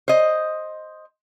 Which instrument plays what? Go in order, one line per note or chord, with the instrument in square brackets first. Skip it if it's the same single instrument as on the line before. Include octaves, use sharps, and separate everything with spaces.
[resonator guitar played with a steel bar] C5 D#5